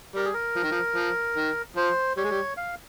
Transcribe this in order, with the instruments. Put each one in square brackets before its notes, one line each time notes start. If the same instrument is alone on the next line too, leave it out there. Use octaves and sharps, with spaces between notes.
[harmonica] G3 [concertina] A#4
[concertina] G#4
A#4
[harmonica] F3
D#3
F3
F3
D#3
[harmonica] F3 [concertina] C5
[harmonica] G3 [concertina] C#5
[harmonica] G#3
G3
[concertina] F5